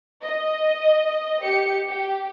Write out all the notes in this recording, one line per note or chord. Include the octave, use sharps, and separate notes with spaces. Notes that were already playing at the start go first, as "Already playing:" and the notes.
D#5
G4 C#7
G4